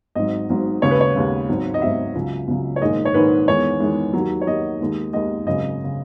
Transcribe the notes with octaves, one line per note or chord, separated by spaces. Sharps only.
G#1 G#2 F#3 D#5
G#1 G#2 F#3
D#2 C#3 G#3 C#5
B4
C#5
D#2 C#3 G#3
G#1 G#2 F#3
D#5
G#1 G#2 F#3 E5
C#2 C#3 F#3
C#2 C#3 F#3
C#5
A#1 G#2 D#3 G#3 D#5
C#5
A#1 G#2 D#3 G#3 B4
E2 D#3 G#3 C#5
E2 D#3 G#3
D#2 D#3 F#3
C#5
D#2 D#3 F#3 D#5
D#2 D#3 G#3
D#2 D#3 G#3 D#5
G#1 F#2 C#3 D#5
C#3